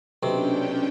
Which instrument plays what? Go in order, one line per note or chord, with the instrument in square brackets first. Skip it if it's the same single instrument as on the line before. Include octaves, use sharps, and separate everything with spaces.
[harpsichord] B1 C3 [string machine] C#4 D4 G5